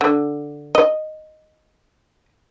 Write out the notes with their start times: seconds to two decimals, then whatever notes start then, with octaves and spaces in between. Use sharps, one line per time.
0.01 D3
0.75 D#5